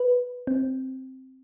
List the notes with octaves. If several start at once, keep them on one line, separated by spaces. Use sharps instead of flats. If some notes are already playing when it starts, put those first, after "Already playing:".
Already playing: B4
C4